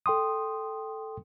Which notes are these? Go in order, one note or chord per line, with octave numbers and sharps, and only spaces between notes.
A4 G5 C6 D#6